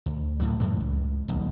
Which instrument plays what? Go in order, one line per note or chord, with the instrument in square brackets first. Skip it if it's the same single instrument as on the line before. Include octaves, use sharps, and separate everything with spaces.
[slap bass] D2
D2 A2 F#3
F#2 A2 E3 G#3
C#2
D#1 B1